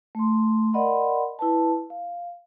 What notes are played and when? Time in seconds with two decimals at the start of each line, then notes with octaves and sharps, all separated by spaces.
0.15 A3 C6
0.73 A#4 D5 D#5 F#5 B5 C6
1.39 E4 B4 A5
1.90 F5